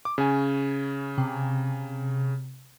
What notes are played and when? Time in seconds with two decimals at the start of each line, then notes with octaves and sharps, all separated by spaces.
0.05 D6
0.18 C#3 C#4 G#5
1.18 C3